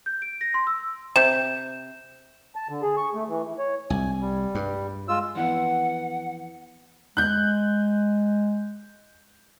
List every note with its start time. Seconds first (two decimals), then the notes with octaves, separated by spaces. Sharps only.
0.06 G6
0.22 D7
0.41 A#6
0.54 C6
0.67 E6
1.16 C3 G6 E7
2.55 A5
2.69 D3
2.82 G#4
2.97 C#6
3.14 A3
3.28 E3
3.43 E3
3.58 C#5
3.90 C2 G#5
4.21 G3
4.55 G2
5.08 G#3 F4 E6
5.35 F2 E3 B3 F#5
7.17 G#3 F#6 G6